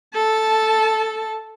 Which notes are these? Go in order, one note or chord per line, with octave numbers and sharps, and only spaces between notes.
A4 A5